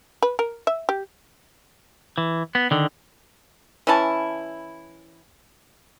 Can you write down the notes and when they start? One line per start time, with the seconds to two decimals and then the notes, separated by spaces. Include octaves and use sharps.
0.22 B4
0.39 A#4
0.67 E5
0.89 G4
2.18 E3
2.55 B3
2.71 D3 D#3
3.87 E3 C#4 E4 A5